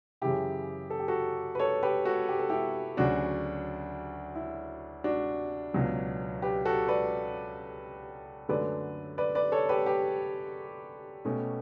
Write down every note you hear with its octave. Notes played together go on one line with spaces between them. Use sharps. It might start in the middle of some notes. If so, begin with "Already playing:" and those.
F#2 C#3 E3 E4 G4
A4
G4
F#4 A4
B4
A4 C#5
G4 B4
F#4 A4
G4
A4
E4 G4
D2 C#3 F#3 C#4 D4 F#4
E4
D4 F#4
C#2 B2 F#3 B3
G4 B4
F#4 A4
B4 D5
F#2 D3 F#3 A3 B4 D5
B4 D5
B4 D5
A4 C#5
G4 B4
G4 B4
B2 A3 C#4